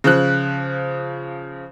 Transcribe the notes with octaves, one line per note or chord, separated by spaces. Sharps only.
C#3 F3 F#6